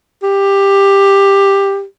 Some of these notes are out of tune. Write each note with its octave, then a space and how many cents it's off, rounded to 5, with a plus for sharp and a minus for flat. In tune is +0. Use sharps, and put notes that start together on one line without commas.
G4 +10